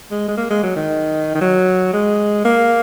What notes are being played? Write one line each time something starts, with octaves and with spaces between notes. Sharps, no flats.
G#3
G#3
A#3
G#3
F#3
D#3
D#3
F#3
G#3
A#3